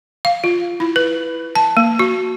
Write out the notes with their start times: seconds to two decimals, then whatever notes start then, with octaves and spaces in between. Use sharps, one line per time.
0.25 F5
0.44 F4
0.80 E4
0.96 B4
1.55 A5
1.77 A#3
1.99 F#4